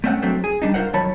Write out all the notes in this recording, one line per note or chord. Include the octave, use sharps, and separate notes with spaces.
A3 C4 C#4 D#5 F#5
G2 F#3 A3 C4 D4
G#4
G3 D4 D#4
C2 F4 A#4 C5 F#5
F2 D#3 F#3 C#5 A5 B5